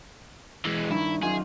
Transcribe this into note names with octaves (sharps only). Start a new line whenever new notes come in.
E3 G#3
G2 D#3 E4
F#2 D#3 F4 G#4